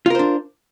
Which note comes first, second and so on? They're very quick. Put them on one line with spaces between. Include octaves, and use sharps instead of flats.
F4 A#4 C5 D4